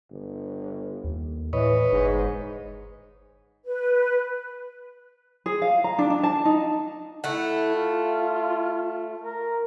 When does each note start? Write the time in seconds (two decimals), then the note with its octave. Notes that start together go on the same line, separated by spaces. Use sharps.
0.11 G1
1.04 D#2
1.53 A2 E3 B4 C#5 D#5
1.92 G1 G#2
3.65 B4
5.46 G#4
5.62 F5
5.84 A#5
5.99 D4
6.10 D4
6.23 A5
6.45 D#4
7.24 A3 E4 F#5
7.75 F4
9.22 A#4